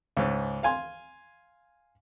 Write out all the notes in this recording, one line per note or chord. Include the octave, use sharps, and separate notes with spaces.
C#2 G#2
F5 G#5 C6